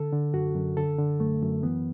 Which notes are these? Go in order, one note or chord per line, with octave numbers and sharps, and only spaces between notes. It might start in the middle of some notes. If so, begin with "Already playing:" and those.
Already playing: D3 A4
D3
F#2 F#4
F#2
D3 A4
D3
F#2 A3
F#2
E3 B3